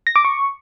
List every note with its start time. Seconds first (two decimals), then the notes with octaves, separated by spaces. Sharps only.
0.07 A#6
0.16 D6
0.25 C#6